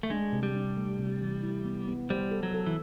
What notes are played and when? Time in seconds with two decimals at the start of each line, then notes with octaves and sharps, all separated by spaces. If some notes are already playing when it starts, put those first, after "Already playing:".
0.03 A3
0.10 G#3 D4
0.33 C3
0.43 G3
0.55 D4
0.76 A3
0.99 C3
1.21 E3
1.43 E4
1.65 B3
1.88 B3
2.10 G3 C5
2.31 A4
2.43 F#3
2.54 A4
2.66 E3